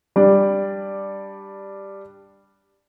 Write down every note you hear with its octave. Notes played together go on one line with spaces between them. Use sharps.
G3 D4 D5